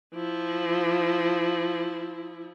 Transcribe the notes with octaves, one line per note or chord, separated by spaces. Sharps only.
F3 E4